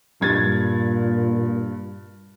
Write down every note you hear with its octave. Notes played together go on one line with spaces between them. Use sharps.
G2 A#2 G#6 A6